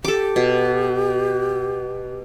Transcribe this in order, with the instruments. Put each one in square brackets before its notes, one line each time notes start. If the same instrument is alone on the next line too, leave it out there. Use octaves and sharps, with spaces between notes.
[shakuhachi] G4 [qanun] A4 D6
[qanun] B2